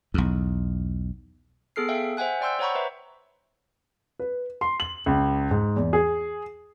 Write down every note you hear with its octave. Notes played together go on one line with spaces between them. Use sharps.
B1 E2
B3 G#4 A4 F6 C7
E5 F5 G5
C5 E5 F#5 G#5 F#6
D5 G5 C6 E6 G6
C5 C#5 F#5 A#5 B5 C#6
B4 C5 E5
B4
C6
F#7
C#2
G#2
E2
G#4